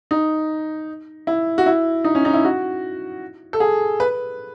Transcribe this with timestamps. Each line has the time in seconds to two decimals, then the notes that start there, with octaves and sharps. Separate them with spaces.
0.11 D#4
1.27 E4
1.58 F#4
1.66 E4
2.04 D#4
2.15 C#4
2.25 D#4
2.34 E4
2.45 F#4
3.53 A4
3.60 G#4
4.00 B4